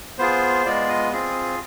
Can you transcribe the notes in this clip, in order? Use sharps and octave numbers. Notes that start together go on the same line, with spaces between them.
B3 F4 G#4 C5
G#3 B3 F4 D5
D#5
C4 F4 G#4